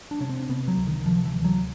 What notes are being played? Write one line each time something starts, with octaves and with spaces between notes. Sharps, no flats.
D4
C3 C#4
C4
C3 B3
F#3
C#2
D#3
C3 F3
E3
D2
F#3